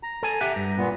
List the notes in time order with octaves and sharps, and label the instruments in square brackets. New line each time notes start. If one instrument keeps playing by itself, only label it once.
[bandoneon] A#5
[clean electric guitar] A4 G#5
G4 E5 F#5
G2
[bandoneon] A#2 B3